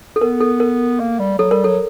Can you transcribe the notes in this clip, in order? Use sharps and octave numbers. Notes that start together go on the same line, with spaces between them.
A4
B3 A#4
A4
A#4
A#3
G3
F#3 A4
G3 A#4
F#3 A4